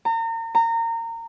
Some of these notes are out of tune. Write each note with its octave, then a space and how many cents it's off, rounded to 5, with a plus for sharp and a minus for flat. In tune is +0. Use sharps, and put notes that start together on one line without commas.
A#5 -35
A#5 -25